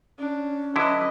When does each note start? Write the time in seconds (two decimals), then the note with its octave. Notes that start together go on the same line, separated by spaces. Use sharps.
0.19 C#4 D4
0.76 D3 F#3 E4 B4 D#5